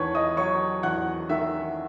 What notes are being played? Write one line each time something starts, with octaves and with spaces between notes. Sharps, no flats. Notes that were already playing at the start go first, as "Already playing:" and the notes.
Already playing: E2 D#3 B4 C#5 A5 C#6
D#5 D#6
F#3 C#5 C#6
E2 F#5 F#6
D#3 E5 E6